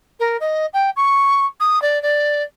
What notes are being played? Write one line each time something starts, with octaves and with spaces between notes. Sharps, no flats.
A#4
D#5
G5
C#6
D#6
D5
D5